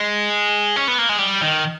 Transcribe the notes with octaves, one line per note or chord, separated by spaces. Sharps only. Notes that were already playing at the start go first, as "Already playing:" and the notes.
Already playing: G#3
C#4
B3
A#3
G#3
G3
D#3